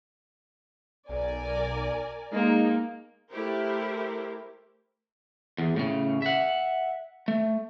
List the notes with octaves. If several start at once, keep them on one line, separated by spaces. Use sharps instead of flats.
B1 A#4 D5 G#5
G#3 A#3 D#4
A3 E4 G4 A#4 C5
E2
A2 C#3
E5 F#5
A3